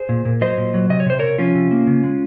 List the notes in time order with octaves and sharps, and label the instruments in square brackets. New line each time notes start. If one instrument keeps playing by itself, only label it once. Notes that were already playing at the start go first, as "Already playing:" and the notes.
Already playing: [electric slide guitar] G#4 C5
A#2
A#2
F#3 C5 D#5
A#2
F#3
C3 D#5
C#5
C3 C5
C3 A#4 C#5
F3 C#4 F4
C3
A#3
C#3
G#3